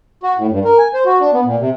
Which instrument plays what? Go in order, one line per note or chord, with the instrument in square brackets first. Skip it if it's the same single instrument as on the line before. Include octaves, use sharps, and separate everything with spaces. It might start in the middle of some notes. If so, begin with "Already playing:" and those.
[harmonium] F#4
A2
G2
A#4
G#5
C5
F#4
D4
B3
A#2
C3